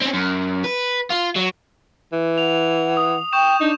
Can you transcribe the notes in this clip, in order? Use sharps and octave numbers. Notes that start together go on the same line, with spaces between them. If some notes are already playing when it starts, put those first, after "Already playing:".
C4 C#4
F#2
B4
F4
F#3
E3
F#5 F7
D#6
G5 C#6 G6 E7
D4 D#4